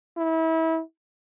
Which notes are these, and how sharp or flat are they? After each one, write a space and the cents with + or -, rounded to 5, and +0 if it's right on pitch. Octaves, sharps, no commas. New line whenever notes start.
E4 -30